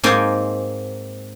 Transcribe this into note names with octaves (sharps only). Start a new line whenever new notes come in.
G#2 A#3 C4 D#4 G5 G#5